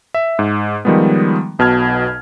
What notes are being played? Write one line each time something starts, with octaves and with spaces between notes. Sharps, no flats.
E5
G#2
D#3 F3 G3 G#3 B3
B1 B2 A5 F6 G#6